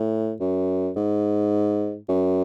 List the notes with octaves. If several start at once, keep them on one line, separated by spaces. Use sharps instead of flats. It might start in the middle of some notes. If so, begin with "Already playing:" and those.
Already playing: A2
F#2
G#2
F#2